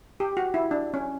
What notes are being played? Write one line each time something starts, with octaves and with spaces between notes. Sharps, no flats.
G4
F#4
E4
D4
C#4